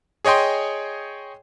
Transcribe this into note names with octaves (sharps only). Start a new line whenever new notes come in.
G#4 C#5 D#5 G5 C6